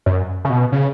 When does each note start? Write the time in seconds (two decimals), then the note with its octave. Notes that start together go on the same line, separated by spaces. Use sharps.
0.06 F#2
0.45 C#3
0.50 B2
0.72 C#3